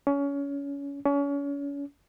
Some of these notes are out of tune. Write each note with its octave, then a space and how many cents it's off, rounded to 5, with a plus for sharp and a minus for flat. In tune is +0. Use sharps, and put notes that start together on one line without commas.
C#4 +25
C#4 +35